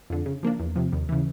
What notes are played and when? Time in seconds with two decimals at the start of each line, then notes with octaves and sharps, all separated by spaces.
0.10 F2 D3
0.26 C#3
0.43 F3 A#3 D4
0.59 E2
0.76 C3 F3
0.92 D#2
1.09 C#3 E3